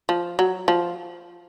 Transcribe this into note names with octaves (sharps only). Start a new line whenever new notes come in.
F3
F#3
F3